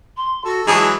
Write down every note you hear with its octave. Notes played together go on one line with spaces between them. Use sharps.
C6
F#4 A4
E3 F#3 G#3 A5 D#6